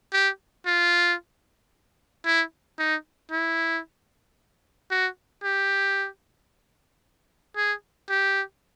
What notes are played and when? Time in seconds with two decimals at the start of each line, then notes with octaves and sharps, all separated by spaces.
0.13 G4
0.66 F4
2.25 E4
2.79 D#4
3.31 E4
4.91 F#4
5.43 G4
7.56 G#4
8.09 G4